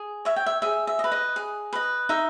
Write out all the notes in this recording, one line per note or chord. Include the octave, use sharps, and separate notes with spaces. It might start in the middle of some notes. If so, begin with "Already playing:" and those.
Already playing: G#4
C#5 E5
G5
E5
G#4 E5
E5
D#5
B4
D#5
G#4
B4 D#5
D#4 E5